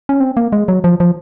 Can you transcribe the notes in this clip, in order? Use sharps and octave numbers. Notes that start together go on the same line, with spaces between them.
C#4
C4
A#3
G#3
F#3
F3
F3